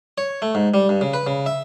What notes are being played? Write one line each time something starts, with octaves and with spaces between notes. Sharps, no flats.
C#5
A3
G#2
G3
G2
C#3
B4
C#3
E5